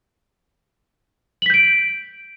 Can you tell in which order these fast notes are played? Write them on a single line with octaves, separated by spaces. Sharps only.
F#7 B6 G6 D7